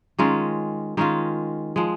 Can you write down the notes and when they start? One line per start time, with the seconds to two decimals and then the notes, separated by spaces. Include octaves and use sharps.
0.19 D#3 G#3 C#4 F4
0.97 D#3 G#3 C#4 F4
1.76 F3 G#3